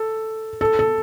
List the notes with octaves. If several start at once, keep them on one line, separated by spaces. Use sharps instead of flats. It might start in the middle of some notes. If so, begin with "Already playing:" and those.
Already playing: A4
A4
A4